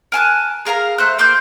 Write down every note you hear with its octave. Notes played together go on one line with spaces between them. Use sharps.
A#4 G#5 A5 F#6
G#4 A#4 F5 A#5
A3 C5 F#6
A#3 C6 D6 G6